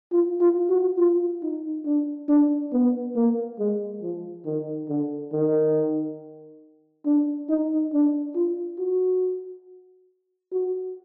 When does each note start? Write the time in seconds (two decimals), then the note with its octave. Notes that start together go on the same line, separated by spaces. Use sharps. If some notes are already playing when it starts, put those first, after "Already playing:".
0.12 F4
0.40 F4
0.69 F#4
0.98 F4
1.42 D#4
1.85 D4
2.28 D4
2.72 B3
3.16 A#3
3.59 G#3
4.02 F3
4.46 D#3
4.89 D3
5.33 D#3
7.05 D4
7.49 D#4
7.93 D4
8.35 F4
8.79 F#4
10.52 F#4